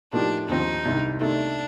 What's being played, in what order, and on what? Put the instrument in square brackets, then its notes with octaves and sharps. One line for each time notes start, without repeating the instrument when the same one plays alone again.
[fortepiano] A2 F3 A#3 D#4 G4 [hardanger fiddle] D4
[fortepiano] D#2 D3 F3 C4 F4 [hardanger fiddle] D#4
[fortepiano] C2 C3 D#3 G3 D4
[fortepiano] C3 D#3 A3 D#4 A4 [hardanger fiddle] D4